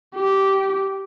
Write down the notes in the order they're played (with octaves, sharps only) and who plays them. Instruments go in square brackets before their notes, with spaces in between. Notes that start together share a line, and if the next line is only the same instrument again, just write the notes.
[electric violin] G4